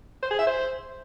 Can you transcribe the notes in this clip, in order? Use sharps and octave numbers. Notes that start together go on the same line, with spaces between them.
C5
G#4
E5
C5